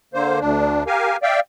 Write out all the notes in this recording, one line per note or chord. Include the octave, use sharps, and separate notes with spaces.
D3 A#3 C5
D2 D4
G4 A#4 F5 G#5
D5 E5 F5 G5